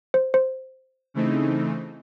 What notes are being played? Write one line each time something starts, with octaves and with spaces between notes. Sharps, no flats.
C5
C5
C#3 E3 A3 C4 D#4